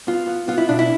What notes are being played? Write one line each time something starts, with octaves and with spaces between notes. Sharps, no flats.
B3 F4
B3
B3 F4
E4
B2 D4
E4